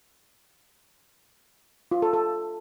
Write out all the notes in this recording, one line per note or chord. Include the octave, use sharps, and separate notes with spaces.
F4
A4
A4